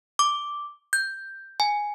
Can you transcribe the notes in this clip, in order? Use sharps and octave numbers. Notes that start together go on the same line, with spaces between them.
D6
G6
G#5